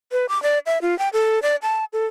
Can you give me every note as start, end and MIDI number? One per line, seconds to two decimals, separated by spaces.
0.12 0.26 71
0.29 0.41 86
0.43 0.59 74
0.66 0.79 76
0.82 0.97 65
0.99 1.09 79
1.13 1.39 69
1.43 1.56 74
1.62 1.85 81
1.93 2.06 69